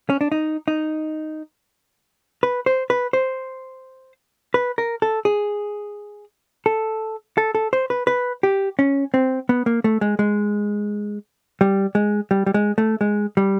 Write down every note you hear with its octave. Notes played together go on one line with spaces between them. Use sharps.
C#4
D4
D#4
D#4
B4
C5
B4
C5
B4
A#4
A4
G#4
A4
A4
A4
C5
B4
B4
G4
C#4
C4
B3
A#3
A3
G#3
G#3
G3
G#3
G3
G3
G#3
A3
G#3
G3